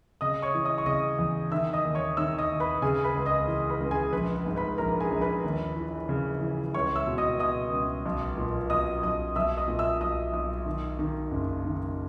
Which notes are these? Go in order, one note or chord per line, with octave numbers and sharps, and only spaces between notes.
C#3 D#5 D#6
C#5 C#6
E3
D#5 D#6
C#6
C#3 D#5 D#6
E2
D#3 E5 E6
D#5 D#6
D#2
C#5 C#6
D#3 E5 E6
D#5 D#6
D#2
B4 B5
C#3 G#4 G#5
B4 B5
C#2
D#5 D#6
E3
B4 B5
C#2
G#4 G#5
A#1 B4 B5
G#2
B4 B5
A#1 A#4 A#5
G#4 G#5
A#1
B4 B5
D#2
E3
C#3
E3
C#2 C#5 C#6
E5 E6
B2
D#5 D#6
B2 D#5 D#6
C#2
B1
A#2
B1 D#5 D#6
B1 D#5 D#6
B1 E5 E6
D#5 D#6
A#2
E5 E6
B1 D#5 D#6
B1
D#3
D#3
F#1
D#3